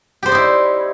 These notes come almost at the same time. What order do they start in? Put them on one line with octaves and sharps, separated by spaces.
G4 C5 D5 D#4 E4